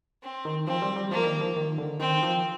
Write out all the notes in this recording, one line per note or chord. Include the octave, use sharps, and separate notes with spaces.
C4
D#3
F3 C4
G3
G3
F3 A#3
D#3
F3
D#3
D3
D#3 C4
F3